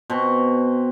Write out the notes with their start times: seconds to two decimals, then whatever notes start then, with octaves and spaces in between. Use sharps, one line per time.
0.10 B2 C4